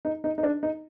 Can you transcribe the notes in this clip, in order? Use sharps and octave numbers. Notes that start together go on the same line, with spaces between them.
D#4
D#4
D#4
D4
D#4